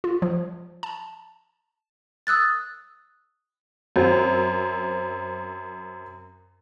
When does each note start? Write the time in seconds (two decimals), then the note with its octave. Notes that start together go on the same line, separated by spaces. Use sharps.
0.04 F4
0.22 F3
0.83 A5
2.27 D#6 E6 F#6 A6
3.96 F#2 C4